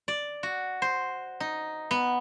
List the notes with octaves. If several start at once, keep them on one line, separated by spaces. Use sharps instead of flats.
D5
F#4
C5
D#4
B3